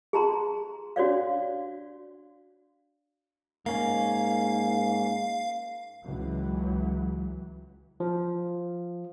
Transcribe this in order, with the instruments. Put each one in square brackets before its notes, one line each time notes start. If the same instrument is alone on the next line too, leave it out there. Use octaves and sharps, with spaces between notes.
[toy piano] G#4 A5 A#5 C6
D4 F#4 C#5 D5 F5
[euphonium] G#2 [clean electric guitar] A#3 C#4 [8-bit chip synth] F5
[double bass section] C#2 E3 F#3
[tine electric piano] F3